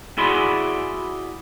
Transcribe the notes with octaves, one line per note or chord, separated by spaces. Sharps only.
E4 F#4 G#4 D5 B5 C6